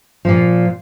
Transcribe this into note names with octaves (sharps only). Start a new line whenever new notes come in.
A#2 F3